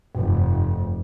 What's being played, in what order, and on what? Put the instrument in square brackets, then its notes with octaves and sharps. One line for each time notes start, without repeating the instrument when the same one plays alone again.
[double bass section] F1 [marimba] G2